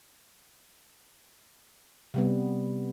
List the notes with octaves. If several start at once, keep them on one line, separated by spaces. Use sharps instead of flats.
C3 G3 B3